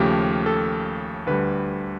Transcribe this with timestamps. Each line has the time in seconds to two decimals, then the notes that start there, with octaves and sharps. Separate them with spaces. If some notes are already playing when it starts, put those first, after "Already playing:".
Already playing: D#2 C#3 F3 A3 G4
0.46 A4
1.27 D2 D3 G3 B4